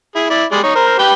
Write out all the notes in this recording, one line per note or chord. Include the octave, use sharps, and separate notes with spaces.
E4 G#4
E4 D5
G3 G#3 D5
D#4 C#5
A#4 C5
G4 B4 G5